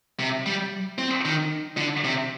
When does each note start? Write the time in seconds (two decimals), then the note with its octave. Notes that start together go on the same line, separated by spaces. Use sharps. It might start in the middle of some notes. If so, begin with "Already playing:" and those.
0.20 C3
0.46 G3
0.98 C4
1.25 D#3
1.77 D3
2.05 C3